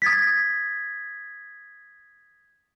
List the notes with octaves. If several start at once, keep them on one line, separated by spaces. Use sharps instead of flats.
D#6 G#6 A6 B6